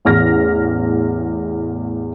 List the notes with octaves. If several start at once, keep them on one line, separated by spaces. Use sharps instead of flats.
A1 E2 F6 A#6